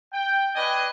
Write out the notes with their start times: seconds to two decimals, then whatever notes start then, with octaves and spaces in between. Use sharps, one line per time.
0.13 G5
0.55 D4 B4 D#5 G5 G#5